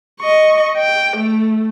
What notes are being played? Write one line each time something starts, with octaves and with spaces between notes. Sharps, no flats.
D#5 C#6
G5
A3